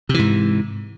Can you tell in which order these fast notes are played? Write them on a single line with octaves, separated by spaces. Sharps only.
C3 E3 G#2